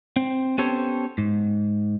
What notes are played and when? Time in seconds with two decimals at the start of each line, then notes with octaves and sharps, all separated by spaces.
0.16 C4
0.58 B3 C#4 G4 A4 C5 C#5
1.18 G#2